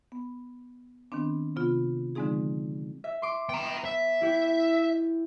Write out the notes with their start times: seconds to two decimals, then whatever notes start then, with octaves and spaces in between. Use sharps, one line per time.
0.12 B3
1.12 D#3 B3 C4 D4
1.56 C3 B3 F4
2.15 D3 F3 G#3 C4 D#4 G#4
3.04 E5
3.22 C6 D6
3.49 B3 G5 A#5
3.85 E5
4.21 E4 G4 C#7